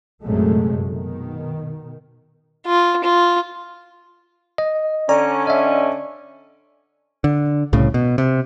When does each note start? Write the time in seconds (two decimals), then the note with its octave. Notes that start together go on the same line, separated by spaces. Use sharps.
0.24 A#1 F#2 C3 F#3 G#3 A3
0.86 B2 D#3
2.67 F4
3.04 F4
4.58 D#5
5.09 D3 C#4 D5 A#5
5.47 D#5 E5
7.24 D3
7.73 C2 A2 C#3
7.94 B2
8.18 C3